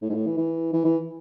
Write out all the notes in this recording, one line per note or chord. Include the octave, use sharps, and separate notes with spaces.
A2
G#2
A2
E3
E3
E3
E3